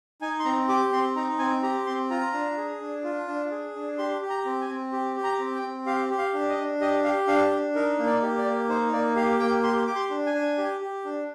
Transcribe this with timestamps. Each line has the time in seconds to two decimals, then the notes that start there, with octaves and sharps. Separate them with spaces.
0.22 D#4 G#5
0.39 C6
0.45 C4 A#5
0.69 G4 D6
0.92 C4 C6
1.16 D#4 A#5
1.39 C4 G#5
1.63 G4 A#5
1.86 C4 C6
2.10 F4 A#5
2.33 D4
2.57 G#4
2.80 D4
3.04 F4
3.28 D4
3.51 G#4
3.75 D4
3.98 G4 C6
4.21 G4
4.30 A#5
4.45 C4
4.61 G#5
4.69 C4
4.92 G4
5.16 G4
5.24 A#5
5.39 C4
5.55 G5
5.62 C4
5.86 G4 F5
6.10 G4
6.18 F5
6.34 D4
6.49 D#5
6.57 D4
6.81 G4 D#5
7.04 G4 F5
7.28 D4 F5
7.51 D4
7.75 D#4 A#4
7.99 A#3
8.06 D5
8.22 G4
8.38 D5
8.46 A#3
8.69 D#4 C5
8.93 A#3 D5
9.16 G4 F5
9.40 A#3 G5
9.63 G4 C6
9.87 G4 D6
9.95 C6
10.10 D4
10.26 G#5
10.34 D4
10.58 G4
10.81 G4
11.05 D4